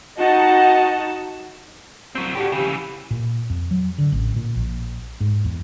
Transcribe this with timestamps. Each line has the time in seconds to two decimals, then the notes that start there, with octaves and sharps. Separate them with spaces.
0.19 D#4 F#4 D#5 F#5 A5
2.15 F#3 C4
2.35 A2 G3 F#4 G4
2.52 C#3 E3 G4
3.11 A#2
3.50 F2
3.71 F#3
3.98 D3
4.12 A1
4.36 A#2
4.55 A#1
5.20 G#2
5.44 E2